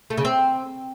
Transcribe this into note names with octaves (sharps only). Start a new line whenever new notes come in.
A3
C#3
C4